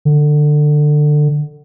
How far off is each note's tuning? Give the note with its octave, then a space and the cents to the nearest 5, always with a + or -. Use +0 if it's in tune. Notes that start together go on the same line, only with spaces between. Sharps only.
D3 +20